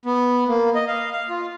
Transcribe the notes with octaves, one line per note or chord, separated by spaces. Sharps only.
B3
A#3
D#5
F5
F5
F4